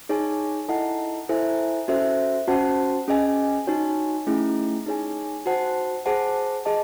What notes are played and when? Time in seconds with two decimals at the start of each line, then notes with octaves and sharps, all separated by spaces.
0.09 D#4 G#4 C#5 G#5
0.68 E4 A4 D#5 F#5 A5
1.29 E4 A4 C5 E5 G#5
1.88 C#4 F#4 A4 C5 E5
2.47 C#4 F#4 C5 F#5 A5
3.08 C#4 G#4 D#5 G#5
3.67 D#4 F#4 C#5 G#5
4.27 A3 C#4 E4 G#4
4.86 D#4 G#4 C#5 G#5
5.46 F#4 C5 F#5 A5
6.06 G#4 C5 F#5 A5
6.65 G#4 D#5 A5